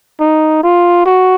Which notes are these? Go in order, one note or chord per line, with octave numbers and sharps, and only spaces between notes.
D#4
F4
F#4